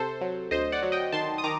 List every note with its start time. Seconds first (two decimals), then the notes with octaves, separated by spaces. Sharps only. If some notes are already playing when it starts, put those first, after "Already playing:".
Already playing: C3 A4 C5
0.21 F#3
0.51 D2 C5 D#5
0.72 D5 F#5
0.83 F#3
0.92 D#5 G5
1.12 D#3 A5 C6
1.38 D#6
1.44 D#3 A#5 D6